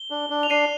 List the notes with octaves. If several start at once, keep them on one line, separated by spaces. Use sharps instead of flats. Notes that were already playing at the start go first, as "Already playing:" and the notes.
Already playing: G7
D4
D4
F7
D4 C7 D#7